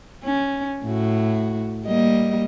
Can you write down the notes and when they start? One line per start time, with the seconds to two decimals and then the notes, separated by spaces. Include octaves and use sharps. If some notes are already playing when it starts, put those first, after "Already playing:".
0.24 C#4
0.84 A2 F#4
1.85 G3 A#3 D#5